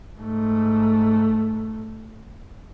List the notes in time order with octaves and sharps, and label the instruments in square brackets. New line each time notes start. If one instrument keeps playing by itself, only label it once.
[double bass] G#2 A3